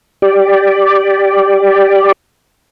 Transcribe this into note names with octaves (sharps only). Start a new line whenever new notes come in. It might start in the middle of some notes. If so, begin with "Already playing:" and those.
G4 D5